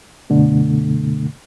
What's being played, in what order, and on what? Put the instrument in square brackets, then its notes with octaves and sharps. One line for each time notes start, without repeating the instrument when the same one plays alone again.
[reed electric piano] F#2 B2 D3 A3